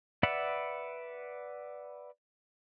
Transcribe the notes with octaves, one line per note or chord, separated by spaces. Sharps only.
B4 D5 E5 F#5 B5